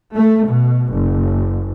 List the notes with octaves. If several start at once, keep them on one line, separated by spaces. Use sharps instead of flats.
A3
B2
F#1